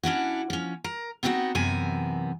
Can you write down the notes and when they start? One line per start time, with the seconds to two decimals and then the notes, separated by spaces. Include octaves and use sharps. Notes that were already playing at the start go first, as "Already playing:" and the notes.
0.03 C#4 D4 E4 F#4
0.50 F3 C#4
0.84 A#4
1.23 B3 C4 D#4 F4 F#4 D#5
1.55 F#2 C3 E3 B3 A#4 G#5